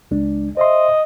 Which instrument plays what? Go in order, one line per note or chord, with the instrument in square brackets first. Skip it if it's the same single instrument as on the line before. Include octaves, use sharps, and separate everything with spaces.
[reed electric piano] C#2 G#3 D4
[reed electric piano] C5 E5 C6 [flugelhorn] D#5